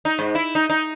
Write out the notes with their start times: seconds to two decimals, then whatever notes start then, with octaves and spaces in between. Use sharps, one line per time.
0.05 D#4
0.19 G#2
0.35 E4
0.55 D#4
0.70 D#4